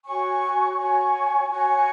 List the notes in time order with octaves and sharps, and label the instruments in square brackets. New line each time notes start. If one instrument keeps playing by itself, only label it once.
[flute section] F#4 C#5 G#5 C#6
F#4 C#5 G#5 C#6
F#4 C#5 G#5 C#6